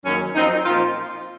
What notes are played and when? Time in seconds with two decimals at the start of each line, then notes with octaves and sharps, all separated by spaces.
0.05 F#2 D#3 A#3 C#4
0.35 F#2 F3 C4 D#4
0.65 A#2 F3 C4 F4